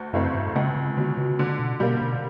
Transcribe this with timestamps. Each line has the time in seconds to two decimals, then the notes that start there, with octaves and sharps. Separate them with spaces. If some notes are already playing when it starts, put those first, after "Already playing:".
Already playing: D2
0.13 F#2 C#3 E3 A3 C4
0.35 G2
0.55 C#2 C#3
0.76 C#3
0.97 B2 D3 F#3
1.17 C#3
1.39 D3
1.59 B2
1.80 B2 G3 A#3
2.01 B2